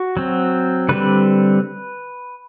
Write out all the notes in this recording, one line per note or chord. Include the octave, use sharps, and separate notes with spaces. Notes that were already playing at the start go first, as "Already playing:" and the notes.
Already playing: F#4
F#3 C4
D3 G3 C4 B4